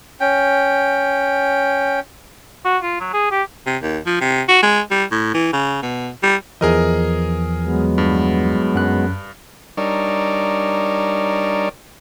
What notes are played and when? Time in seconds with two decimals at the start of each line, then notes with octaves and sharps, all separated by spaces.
0.20 C#4 G5
2.65 F#4
2.83 F4
3.00 F#3
3.14 G#4
3.31 G4
3.67 C3
3.83 D#2
4.06 F3
4.21 C3
4.48 F#4
4.63 G#3
4.91 G3
5.11 A2
5.34 E3
5.53 C#3
5.82 B2
6.23 G3
6.61 E2 E3 F3 G#4 A#4 D#5
7.64 F#3 G#3 B3
7.98 G2
8.75 F#2 F#6
9.77 G3 D4 D#4 A#4 C#5 D5